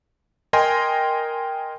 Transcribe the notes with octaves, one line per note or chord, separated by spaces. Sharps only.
A#4 D#5 G5 G#5 C6